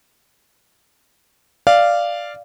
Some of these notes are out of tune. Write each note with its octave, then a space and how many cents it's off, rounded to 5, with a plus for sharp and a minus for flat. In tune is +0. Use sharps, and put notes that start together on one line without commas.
D5 +0 F5 -10